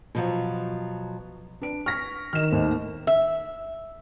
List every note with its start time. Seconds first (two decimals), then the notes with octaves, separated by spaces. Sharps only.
0.15 B2 F3 F#3
1.61 D4 B4 D7
1.86 C#6 F6 A#6 B6
2.33 D#3 F6 E7
2.51 D#2 A2 C5
3.07 E5